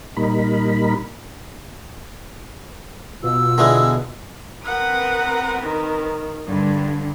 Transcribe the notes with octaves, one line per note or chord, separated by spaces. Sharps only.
A#2 G3 D#4 A#4 B5
B2 F4 E6
D3 E3 G#3
C4 A#4 B4 F#5 D#6
D#3
G2 D3